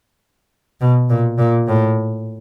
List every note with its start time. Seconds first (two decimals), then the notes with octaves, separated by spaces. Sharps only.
0.81 B2
1.10 A#2
1.39 A#2
1.68 A2